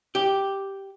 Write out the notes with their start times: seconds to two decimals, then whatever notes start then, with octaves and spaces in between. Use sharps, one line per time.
0.15 G4